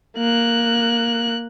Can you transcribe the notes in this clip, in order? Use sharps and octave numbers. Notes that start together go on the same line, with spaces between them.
A#3 F#6